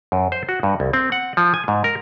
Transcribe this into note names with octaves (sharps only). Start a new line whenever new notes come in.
F#2
C5
F#4
G2
C2
C4
F#5
F3
G#5
G#2
A#4